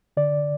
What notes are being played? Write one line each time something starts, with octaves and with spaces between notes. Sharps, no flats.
D3 D5